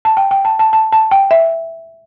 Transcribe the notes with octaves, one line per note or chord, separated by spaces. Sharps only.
A5
G5
G5
A5
A5
A5
A5
G5
E5